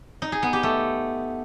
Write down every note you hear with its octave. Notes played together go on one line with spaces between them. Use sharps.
D#4
G#4
B3
G4
A3